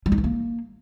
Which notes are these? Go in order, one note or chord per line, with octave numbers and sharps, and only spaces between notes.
G3
D#4
E3
A#3